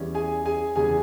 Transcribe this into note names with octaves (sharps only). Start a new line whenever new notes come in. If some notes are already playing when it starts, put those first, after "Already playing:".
Already playing: E2 E3 G3 C#4
G#4 G#5
G#4 G#5
E2 C#3 E3 G3 G#4 G#5